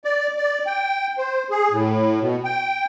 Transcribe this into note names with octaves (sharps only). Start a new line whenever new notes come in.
D5
D5
G5
C5
G#4
A2
B2
G5